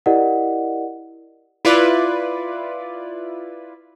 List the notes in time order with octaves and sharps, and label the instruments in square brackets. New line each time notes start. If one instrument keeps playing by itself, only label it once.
[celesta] E4 G4 A#4 D5 D#5 F#5
[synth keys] E4 F4 B4 D5